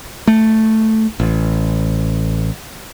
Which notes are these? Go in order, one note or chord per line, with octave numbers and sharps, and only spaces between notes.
A3
A1